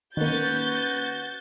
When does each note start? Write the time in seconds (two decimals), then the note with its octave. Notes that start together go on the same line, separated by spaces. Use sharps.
0.17 D#3 A#3 C#4 F#4 B4 G6 A6